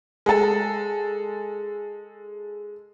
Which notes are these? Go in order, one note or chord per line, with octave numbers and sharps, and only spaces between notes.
G#3 A4